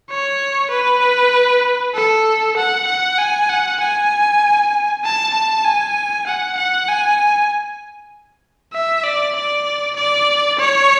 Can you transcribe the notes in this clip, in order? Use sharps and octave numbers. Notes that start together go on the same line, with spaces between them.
C#5
B4
A4
F#5
F#5
G#5
F#5
G#5
A5
A5
G#5
F#5
F#5
G#5
E5
D5
D5
D5
C#5